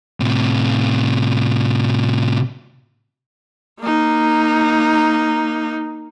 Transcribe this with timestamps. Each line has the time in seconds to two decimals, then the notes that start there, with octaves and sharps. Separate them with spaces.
0.20 A2 C3
3.81 A#3 D#4